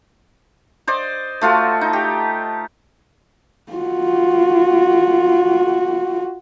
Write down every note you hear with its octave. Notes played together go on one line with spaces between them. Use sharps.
C5 D5 D#5
A3 F4 F#4 A4
D#4
G4
F4 F#4